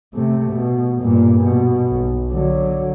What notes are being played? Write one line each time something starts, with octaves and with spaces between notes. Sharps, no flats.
C3 A3
B2
G2 A#2
B2
B1
D3 F#3